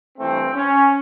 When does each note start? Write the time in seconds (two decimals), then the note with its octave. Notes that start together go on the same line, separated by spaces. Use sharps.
0.18 G2 E3 A3 C4
0.54 C#4